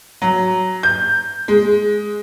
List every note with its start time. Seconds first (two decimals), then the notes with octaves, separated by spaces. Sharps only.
0.22 F#3
0.83 G6
1.48 G#3